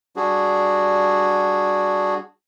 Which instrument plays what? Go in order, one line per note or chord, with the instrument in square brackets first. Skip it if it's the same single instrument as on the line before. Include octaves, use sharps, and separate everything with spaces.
[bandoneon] G3 D4 F#4 G#4